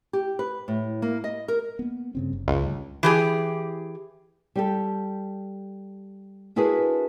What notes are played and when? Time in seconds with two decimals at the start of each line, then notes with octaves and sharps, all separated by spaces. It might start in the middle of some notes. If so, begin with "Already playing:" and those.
0.13 G4
0.39 B4
0.68 A2
1.02 A#3
1.24 D#5
1.48 A#4
1.79 A#3 B3
2.15 G2 C#3 C4
2.33 F#1
2.48 C#2
2.62 D2 G2
3.03 E3 G4 G#4
4.56 G3 G4 A4
6.56 D4 E4 F#4 G#4 A#4 B4